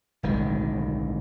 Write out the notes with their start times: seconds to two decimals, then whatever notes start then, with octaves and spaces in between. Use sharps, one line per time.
0.23 D1 B1 D#3 G#3